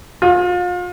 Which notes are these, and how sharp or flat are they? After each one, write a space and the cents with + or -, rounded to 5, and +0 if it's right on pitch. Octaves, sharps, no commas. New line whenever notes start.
F4 +35